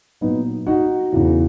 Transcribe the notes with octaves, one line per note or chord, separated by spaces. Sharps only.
A#2 F#3 B3 D#4
D#4 F#4
E2 C#3 E3